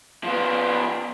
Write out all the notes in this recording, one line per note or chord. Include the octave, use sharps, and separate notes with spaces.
F3 B3